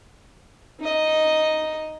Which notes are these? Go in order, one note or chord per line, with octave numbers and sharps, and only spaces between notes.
D#4 D#5